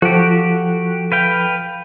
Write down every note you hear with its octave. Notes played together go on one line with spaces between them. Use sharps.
F3 F#4 G4 A4
B4 F5 G5